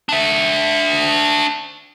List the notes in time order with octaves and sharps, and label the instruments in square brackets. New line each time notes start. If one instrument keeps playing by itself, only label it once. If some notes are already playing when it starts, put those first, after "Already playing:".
[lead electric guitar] D4 E5